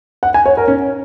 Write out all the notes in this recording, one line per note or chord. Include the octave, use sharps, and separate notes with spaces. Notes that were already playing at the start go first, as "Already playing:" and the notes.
F#5
G#5
C#5
A#4
C#4